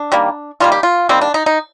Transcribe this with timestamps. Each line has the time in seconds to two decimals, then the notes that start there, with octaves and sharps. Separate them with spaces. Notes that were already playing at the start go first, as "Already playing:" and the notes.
Already playing: D4
0.12 D#3 G3 A#3
0.60 D#3 G3 A#3 F4
0.72 G4
0.83 F4
1.09 D#3 G3 A#3 C4
1.21 D4
1.34 D#4
1.46 D#4